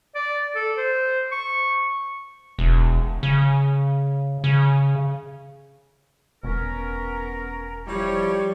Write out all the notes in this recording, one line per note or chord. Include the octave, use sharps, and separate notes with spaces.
D5
A4
C5
C#6
E1
C#3
C#3
E1 B3 C#4 A#4
F3 G3 E4 C#5 D5 C#6